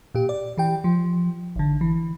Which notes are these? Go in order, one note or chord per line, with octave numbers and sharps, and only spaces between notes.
A#2 G4
D5
E3 G4 G5
F3
G#1 D3
E3